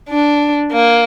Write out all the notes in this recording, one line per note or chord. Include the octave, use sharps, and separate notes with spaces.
D4
A#3